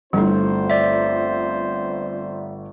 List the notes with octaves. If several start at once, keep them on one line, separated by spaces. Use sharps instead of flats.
G1 G3 A3 C4 D4 E4 F4 C5
D5 E5